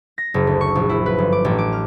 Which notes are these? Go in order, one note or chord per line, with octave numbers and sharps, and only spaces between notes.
A#6
F#1
D2
C#6
A#1
E4
B4
G1
D6
A1
D6
F6